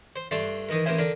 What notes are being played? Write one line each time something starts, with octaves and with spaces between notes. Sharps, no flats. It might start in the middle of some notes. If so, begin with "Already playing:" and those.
C5
G2 A3 D4 A5 C6
D#3 E3 D#4 A#4
A1 E3 A#4 C5 E5 G#5
D3 D4 A#4